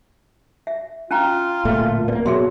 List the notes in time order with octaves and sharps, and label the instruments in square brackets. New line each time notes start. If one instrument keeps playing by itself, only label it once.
[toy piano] E5
[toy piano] C#4 G5 A#5 [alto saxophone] F4
[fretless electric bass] D1 A#2 A3
[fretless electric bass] A#3 B3 [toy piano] D5
[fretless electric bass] B2 F#3 [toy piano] G#4 E5 C6